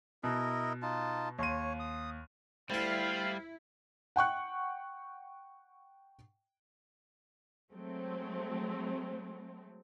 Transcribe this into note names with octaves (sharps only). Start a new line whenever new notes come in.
B2 E4 A#4 D#5
D#4 F4 A5
D#2 C#5 C6 D#7
D#6
D2 G3 E4 F4 A4 F5 B5
F#5 G5 C#6 F#6
F#3 G#3 A3 C4